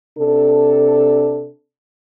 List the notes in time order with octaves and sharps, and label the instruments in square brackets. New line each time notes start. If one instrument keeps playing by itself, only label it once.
[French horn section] C3 D4 A4